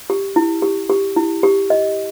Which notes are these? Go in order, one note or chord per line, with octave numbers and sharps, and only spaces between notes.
G4
E4
G4
G4
E4
G4
D#5